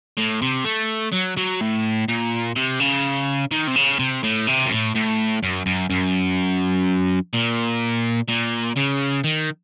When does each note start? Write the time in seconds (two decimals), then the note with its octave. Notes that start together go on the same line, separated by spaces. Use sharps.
0.17 A2
0.42 C3
0.65 A3
1.12 F#3
1.37 F#3
1.61 A2
2.08 A#2
2.56 C3
2.80 C#3
3.51 D#3
3.67 C3
3.76 C#3
3.99 C3
4.23 A2
4.47 C3
4.66 F#2
4.71 A2
4.95 A2
5.43 F#2
5.66 F#2
5.90 F#2
7.33 A#2
8.29 A#2
8.77 C#3
9.24 D#3